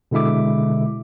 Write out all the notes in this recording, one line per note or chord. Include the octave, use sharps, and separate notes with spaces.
B2 D3 G#3 E4 E5 D6